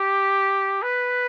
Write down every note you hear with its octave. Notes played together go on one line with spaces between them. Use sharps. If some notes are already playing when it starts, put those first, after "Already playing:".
Already playing: G4
B4